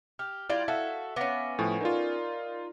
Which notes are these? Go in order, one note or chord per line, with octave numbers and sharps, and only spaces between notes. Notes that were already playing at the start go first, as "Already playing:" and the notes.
G4 F6
G3 E4 F4 D5 G#6
F#4 A4 E5 F5
B3 C#4 F5 D6 A#6
A2 F3 A4 G#5 C#6
D#4 F4 A#4 D5